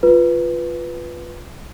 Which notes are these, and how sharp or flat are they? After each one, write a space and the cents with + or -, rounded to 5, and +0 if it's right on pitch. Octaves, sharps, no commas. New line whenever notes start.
F4 +0 B4 +0